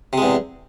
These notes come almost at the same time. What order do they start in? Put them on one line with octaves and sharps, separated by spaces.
C3 G#3 E2